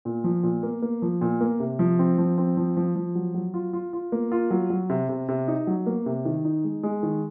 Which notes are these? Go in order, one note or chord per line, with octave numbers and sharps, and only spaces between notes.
A#2
F3
A#2
A#3
A#3
F3
A#2
A#3
C3
F3
C4
F3
C4
F3
F3
F3
F#3
F#3
F4
F4
F4
A#3
F4
F#3
F#3
C3
C3
C3
D#4
F#3
A#3
C3
D#3
D#4
G#3
G#3
D#3